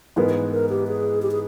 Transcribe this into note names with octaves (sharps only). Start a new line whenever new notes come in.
G#2 E3 G#3 B3 A#4
A#4
B4
A#4
G4
G#4
G4
G#4